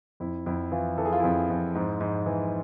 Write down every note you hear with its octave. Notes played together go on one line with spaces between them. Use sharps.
F2 E4
F2 E4
E3 F4
E3 A4
G#4
F4
F2 E4 G#4
F2
G#2
G#2
E3